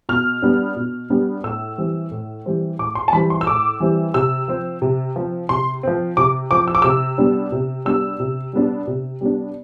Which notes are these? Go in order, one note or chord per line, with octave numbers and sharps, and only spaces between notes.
B2 F6
G3 B3 D4
B2
G3 B3 D4
A2 E6
E3 G3 C4
A2
E3 G3 C4
A2 D6
C6
A5
E3 G3 C4 B5
C6
E6
A2 D6
E3 G3 C4
C3 E6
F3 C4
C3
F3 C4
C3 C6
F3 C4
C3 D6
F3 C4 D6
E6
D6
C3 E6
G3 B3 D4
C3
G3 B3 D4 E6
C3
G3 B3 D4
C3
G3 B3 D4